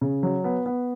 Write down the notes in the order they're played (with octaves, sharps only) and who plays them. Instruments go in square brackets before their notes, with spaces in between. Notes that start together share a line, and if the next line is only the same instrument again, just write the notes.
[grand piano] C#3
F#3
B3
B3